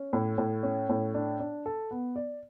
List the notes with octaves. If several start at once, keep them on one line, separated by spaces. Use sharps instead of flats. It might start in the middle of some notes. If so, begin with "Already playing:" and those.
Already playing: C#4
A2
A2
C#4
A2
D4
D4
A4
B3
D5